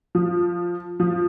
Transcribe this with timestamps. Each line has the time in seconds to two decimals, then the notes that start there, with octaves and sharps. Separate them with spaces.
0.15 F3
1.00 F3